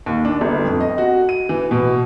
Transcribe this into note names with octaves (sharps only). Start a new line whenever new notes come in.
D#2
D4
G1
F2
D#5
F#4
D#7
E3
B2